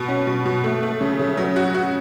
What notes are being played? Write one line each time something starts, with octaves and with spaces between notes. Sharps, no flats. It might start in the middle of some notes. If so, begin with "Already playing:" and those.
Already playing: B2
C#4
B2
B2
A3
A3
C#3
C#3
F#3
F#4
F#4